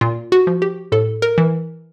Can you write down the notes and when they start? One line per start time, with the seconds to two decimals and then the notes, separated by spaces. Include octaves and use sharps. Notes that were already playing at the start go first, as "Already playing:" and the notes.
0.01 A#2 F4
0.32 F#4
0.47 F3
0.62 G4
0.92 A2 A4
1.22 A#4
1.38 E3